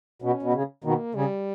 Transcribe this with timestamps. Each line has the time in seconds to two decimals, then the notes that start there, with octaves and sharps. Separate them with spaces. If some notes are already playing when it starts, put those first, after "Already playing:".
0.22 B2 C#4
0.43 B2
0.53 C#3
0.84 B2 D#3 A#3
1.15 C#3 G3